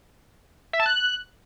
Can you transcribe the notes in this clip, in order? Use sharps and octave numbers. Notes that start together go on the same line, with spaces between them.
E5
A5
F#6